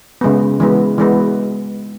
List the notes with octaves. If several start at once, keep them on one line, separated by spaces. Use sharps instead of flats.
C#3 G#3 B3
E3 G#3 B3
E3 G#3 B3